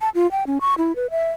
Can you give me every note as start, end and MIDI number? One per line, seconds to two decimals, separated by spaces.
0.01 0.09 81
0.15 0.30 65
0.31 0.46 79
0.47 0.58 61
0.61 0.74 85
0.78 0.95 64
0.96 1.10 71
1.10 1.29 76